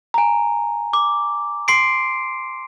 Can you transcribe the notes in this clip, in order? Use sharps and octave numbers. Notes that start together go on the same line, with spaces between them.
G#5 A#5
D6
C6 C7 D7